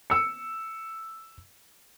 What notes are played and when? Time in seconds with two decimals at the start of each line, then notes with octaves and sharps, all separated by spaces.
0.10 E6 C#7